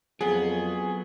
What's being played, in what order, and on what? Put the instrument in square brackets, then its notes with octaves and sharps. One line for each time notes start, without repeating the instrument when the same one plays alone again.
[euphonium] F2 [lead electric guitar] F#3 B3 [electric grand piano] G#4